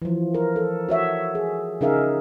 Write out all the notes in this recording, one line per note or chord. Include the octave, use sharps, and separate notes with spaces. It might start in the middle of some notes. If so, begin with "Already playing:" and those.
E3 F3
A#4
A4
F#4 C#5 E5
G#4
C#3 D#4 G#4 A#4 E5 F5